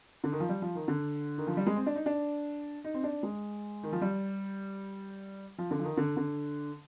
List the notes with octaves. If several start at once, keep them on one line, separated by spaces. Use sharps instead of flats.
D3
D#3
F3
G3
F3
D#3
D3
D#3
F3
G3
G#3
C4
D4
D#4
D4
D#4
C4
D4
G#3
D#3
F3
G3
F3
D3
F3
D#3
D3
D3